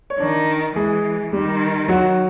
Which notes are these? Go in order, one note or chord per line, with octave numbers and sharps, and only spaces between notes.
C#5
D#3 D4 D5
E3 G#3 G#4
D#3 G3 G4
F#3 F#4